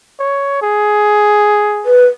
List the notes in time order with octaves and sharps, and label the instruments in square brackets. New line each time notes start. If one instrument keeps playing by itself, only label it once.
[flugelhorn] C#5
G#4
[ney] B4